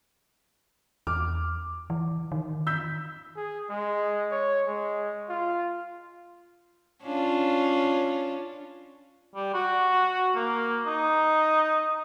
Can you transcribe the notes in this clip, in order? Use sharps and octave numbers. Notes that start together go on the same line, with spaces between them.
E2 D6 F6
E3
D#3
E6 G6 B6
G#4
G#3
C#5
G#3
F4
C#4 D4 F4
G3
F#4
A#3
D#4